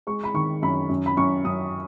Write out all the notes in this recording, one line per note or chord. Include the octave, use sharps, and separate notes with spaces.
G#3 C#6
B5
D#3 C#6
F#2 B5
F#2
B5
F#2 C#6
F#2 D#6